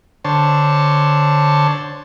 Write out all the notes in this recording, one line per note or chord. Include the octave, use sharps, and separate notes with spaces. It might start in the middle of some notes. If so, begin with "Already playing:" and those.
D3 C5 C#5 A5